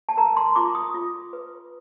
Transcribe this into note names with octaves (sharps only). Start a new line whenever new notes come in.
A5
A#4 A#5
C6
F4 D6
D#6
F4
B4